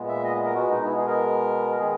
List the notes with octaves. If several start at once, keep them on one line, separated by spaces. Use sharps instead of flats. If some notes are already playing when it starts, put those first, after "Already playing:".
Already playing: A#2 G#3 B3
E5
D#5
A#4
B2 G#3 B3 F#4
D#4
E4
G#4
A#4
D#3 G#3 B3 G#4